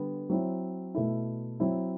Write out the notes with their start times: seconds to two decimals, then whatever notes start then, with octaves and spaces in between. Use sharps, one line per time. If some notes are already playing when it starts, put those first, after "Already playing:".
Already playing: D3 G3 B3
0.29 F#3 C4 E4
0.94 B2 A3 E4
1.60 F#3 C4 E4